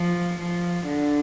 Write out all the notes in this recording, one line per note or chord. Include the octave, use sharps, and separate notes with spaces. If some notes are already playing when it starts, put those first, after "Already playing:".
Already playing: F3
F3
D3